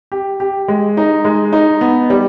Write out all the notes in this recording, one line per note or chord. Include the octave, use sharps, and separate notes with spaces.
G4
G4
G#3
D#4
G#3
D#4
B3
G3